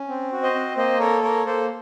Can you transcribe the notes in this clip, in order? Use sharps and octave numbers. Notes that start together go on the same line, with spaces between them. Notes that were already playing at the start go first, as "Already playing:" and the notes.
Already playing: C#4
C4
F#4
C5 D#5
C4
A#3 C5 D#5
A4 A#4 C#5
A#3 A#4 C#5
A#3 A4 C5